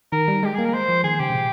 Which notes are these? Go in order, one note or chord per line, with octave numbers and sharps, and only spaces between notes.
D#3 A#4
G3
G#3 G4
A#3 G#4
A#4
G#3 C5
F3
D#3 G#4
C#3 G4
C3
A#2